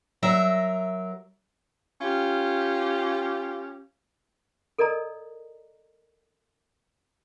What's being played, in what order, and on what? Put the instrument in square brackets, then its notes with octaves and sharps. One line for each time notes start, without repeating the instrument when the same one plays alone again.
[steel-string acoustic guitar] F#3 A#4 E5
[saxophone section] C#4 F4 G4
[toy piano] A4 A#4 D5 D#5 A#5